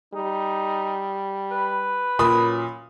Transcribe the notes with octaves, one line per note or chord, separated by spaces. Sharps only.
G3 D#4
B4
F#2 A#2 B5 D#6